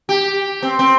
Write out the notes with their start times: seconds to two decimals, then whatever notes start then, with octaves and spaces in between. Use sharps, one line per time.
0.09 G4
0.62 C4
0.79 C4